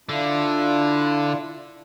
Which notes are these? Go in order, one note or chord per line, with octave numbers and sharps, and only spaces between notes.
D3 D4 E4 F4